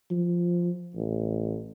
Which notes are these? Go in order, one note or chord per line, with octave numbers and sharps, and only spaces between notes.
F3
A1